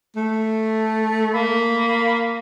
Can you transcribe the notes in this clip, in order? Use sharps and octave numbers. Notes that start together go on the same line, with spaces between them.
A3
A#3 B5